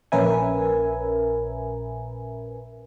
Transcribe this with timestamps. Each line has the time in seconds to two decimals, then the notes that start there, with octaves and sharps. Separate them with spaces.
0.12 A#1 C#4 A#4 B4 E5 G#5